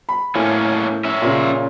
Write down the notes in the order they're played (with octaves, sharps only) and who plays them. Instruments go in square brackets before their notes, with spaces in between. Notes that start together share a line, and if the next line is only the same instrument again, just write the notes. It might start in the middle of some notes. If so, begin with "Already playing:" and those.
[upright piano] B5
[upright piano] A2 [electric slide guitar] A3 A#3 C#4
[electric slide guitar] C#4 E5
[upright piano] A#2 C#3